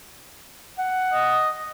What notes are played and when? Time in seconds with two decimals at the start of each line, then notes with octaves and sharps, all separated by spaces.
0.78 F#5
1.13 D#5